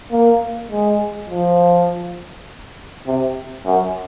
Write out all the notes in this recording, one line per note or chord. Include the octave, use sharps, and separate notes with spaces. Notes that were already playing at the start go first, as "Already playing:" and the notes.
A#3
G#3
F3
C3
F#2